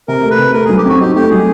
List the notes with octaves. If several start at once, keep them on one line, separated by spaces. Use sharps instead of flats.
C3 A#4
A3
B4
C3
A3 A#4
F#3 G#4
G4
C4 F#4
D#4 G4
A3 G4
F#3 G#4